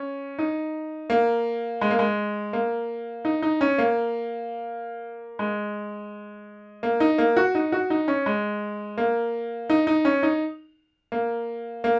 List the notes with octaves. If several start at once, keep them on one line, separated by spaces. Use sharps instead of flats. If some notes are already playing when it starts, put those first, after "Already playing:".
Already playing: C#4
D#4
A#3
G#3
A#3
G#3
A#3
D#4
D#4
C#4
A#3
G#3
A#3
D#4
A#3
F#4
D#4
F#4
D#4
C#4
G#3
A#3
D#4
D#4
C#4
D#4
A#3
A#3